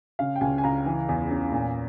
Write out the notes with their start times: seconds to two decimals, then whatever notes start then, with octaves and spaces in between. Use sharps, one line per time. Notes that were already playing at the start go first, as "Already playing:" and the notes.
0.19 C#3 F5
0.36 G5
0.41 C#2 G#5
0.58 G#5
0.64 C#2 A#5
0.86 E3
1.09 E2
1.31 C#4
1.52 A#2